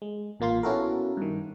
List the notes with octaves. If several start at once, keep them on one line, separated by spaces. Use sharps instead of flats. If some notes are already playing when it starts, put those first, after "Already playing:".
G#3
A1 A#2 A#3 F4 C6
B3 C#4 E4 F#4 A4 A#4
G2 D#3